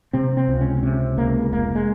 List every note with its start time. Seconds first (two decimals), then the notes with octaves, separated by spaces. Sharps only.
0.13 C3 C4
0.37 C4
0.48 C#2
0.61 C#4
0.77 C4
0.83 C3 C#4
1.18 C#2 A#3
1.53 F1 A#3
1.75 G#3